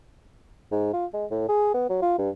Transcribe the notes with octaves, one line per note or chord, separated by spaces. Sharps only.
G#2
F4
G#3
A2
G#4
B3
F#3
F4
G2